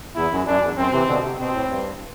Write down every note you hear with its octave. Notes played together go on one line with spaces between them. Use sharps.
E2 E4
F#2
F#2 D4
E2
F#2 C4
C3 E3
B2 D3
C3
B2 C4
A2
G2